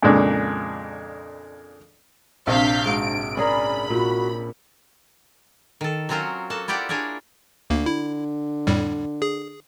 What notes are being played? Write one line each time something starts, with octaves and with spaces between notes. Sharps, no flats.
F2 A#2 C#3 G#3 D4
A#1 C3 D4 E5 F5 G6 B6
G#2 F#4 D7
C#4 G#4 A#4 D5 B5
A#2 F#4
D#3 A4
F#3 C4 C#4 F4 A#4 C5
A#3 F#4 A4 A5
E4 F4 G4 D5 F#5 G5
D4 G#4 A#4 C#5 D5
D2 D3 A#3
E4
F2 A2 G3
G#4